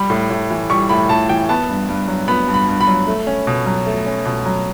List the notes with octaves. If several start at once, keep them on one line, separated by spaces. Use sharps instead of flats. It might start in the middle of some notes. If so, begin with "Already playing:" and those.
Already playing: G3 B5
A2
A2
E3
G3 C#6
A2 B5
A2 A5
E3 G5
B3 A5
G2
G2
F#3
B3 B5
G2
B5
G2
B5
F#3
A3
C#4
B2
F#3
A3
C#4
B2
F#3